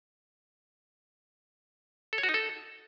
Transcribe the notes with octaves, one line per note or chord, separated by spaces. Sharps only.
A4
C#5
F#4
D#4
A4